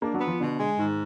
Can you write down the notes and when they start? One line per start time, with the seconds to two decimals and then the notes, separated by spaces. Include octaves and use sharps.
0.02 A#3 D4
0.14 F#3
0.21 B3
0.27 F3
0.40 B2 D3
0.59 G#3
0.78 G#2 D#3